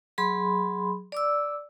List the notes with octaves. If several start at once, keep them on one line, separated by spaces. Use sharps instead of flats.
F#3 G#4 B5 C6
D5 D6 E6